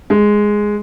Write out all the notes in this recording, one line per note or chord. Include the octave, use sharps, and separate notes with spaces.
G#3